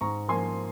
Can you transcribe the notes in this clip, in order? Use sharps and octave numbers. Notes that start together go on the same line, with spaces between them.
G#2 A#5 C#6
F3 A#3 G#5 C6